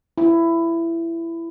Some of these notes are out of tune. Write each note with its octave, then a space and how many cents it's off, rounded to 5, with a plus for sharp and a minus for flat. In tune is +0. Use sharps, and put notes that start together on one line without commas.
E4 +15